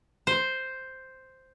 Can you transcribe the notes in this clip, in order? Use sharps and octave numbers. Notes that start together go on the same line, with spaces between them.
C5